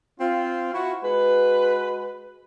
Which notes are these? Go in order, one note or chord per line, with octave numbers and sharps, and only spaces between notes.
C4 F4
E4 F#4
G#3 F#4 B4